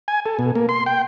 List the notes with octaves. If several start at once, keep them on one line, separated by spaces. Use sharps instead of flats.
G#5
A4
B2
A#3
C6
G5